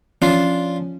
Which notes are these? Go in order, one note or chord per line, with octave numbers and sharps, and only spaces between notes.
F3 C#4 D4 F4